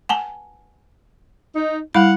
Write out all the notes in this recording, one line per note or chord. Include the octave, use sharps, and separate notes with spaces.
F#5 G#5 A5
D#4
G3 E4 F5 F#5 B5